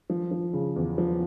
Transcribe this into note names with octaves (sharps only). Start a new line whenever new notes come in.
F3
F3
C#3
E2
F3